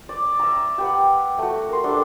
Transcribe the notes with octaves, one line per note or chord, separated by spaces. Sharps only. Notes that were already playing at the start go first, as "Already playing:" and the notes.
D5
E5 A#5
G4 B4 F#5
A3 F#4
A#4 C6
G3 B3 D4 A4